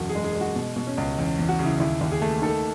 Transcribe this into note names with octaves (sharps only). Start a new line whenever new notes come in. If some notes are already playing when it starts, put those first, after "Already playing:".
Already playing: E1 F#2 F#4
G#4
G#3
G#4
G#3
F#4
B2
B2
C#4
C#2
E2 C#4
E2
F#4
C#3
E4
D#2 E4
D#2
G#4
A3
D#3 A4